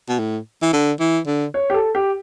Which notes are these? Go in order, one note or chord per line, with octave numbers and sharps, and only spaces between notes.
B2
A2
E3
D3
E3
D3
C#5
G4
A4
G4